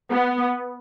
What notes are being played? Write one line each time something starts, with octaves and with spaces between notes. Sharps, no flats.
B3